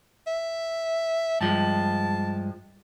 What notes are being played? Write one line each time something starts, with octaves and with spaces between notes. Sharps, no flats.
E5
G2 F3 G#3 A5